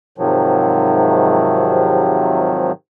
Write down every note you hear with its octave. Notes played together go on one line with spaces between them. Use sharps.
G#2 C3 D#3 F3 F#3